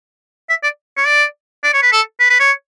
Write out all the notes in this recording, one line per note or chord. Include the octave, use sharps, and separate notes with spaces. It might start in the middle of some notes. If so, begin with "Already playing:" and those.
E5
D5
C#5
D5
D5
C#5
B4
A4
B4
B4
C#5